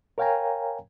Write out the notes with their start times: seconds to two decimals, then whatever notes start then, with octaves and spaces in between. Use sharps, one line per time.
0.18 A#4 C#5 F5 G5 G#5 A#5